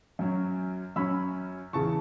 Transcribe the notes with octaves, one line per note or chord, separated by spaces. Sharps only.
F#2 F#3 C#4
F#2 F#3 C#4 B5 E6
E2 C#3 E3 A5 C#6